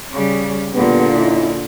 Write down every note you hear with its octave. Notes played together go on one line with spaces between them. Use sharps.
C#3 G3
E2 A#2 D3 G3 B3
C#4 D#4 E4